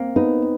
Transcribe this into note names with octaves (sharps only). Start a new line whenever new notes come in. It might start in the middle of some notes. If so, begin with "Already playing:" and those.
Already playing: A#3 C4
B3 D#4